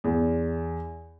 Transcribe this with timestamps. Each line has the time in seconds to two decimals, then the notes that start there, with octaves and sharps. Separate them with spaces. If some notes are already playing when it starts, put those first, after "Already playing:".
0.04 E2